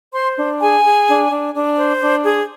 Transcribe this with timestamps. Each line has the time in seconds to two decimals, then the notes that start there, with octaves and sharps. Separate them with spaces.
0.12 C5 C6
0.36 D4
0.60 G#4 G#5
0.84 G#4
1.07 D4
1.31 D4
1.54 D4
1.77 C5
2.01 D4
2.24 G#4